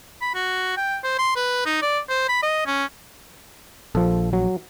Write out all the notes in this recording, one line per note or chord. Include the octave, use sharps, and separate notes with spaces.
B5
F#4
G5
C5
C6
B4
D#4
D5
C5
B5
D#5
C#4
A#1 F3 A4
F#3